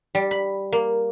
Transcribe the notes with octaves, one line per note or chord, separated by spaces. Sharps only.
G3
B5
A#3